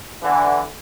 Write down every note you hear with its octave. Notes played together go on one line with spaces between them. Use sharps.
D3 E3